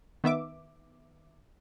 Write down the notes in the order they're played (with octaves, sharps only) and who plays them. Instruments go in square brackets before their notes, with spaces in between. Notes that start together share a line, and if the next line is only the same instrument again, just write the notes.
[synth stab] D#3 B3 E5 D6